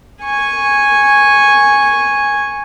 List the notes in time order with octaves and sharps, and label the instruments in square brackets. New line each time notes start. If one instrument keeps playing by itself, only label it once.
[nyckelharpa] G#5 C#6